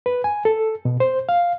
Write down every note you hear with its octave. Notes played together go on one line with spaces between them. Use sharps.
B4
G#5
A4
B2
C5
F5